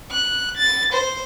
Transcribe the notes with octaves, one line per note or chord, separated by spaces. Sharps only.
F#6
A6
C5